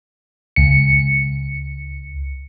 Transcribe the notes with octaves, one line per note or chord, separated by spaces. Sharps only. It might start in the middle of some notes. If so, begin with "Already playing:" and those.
C#2 C#7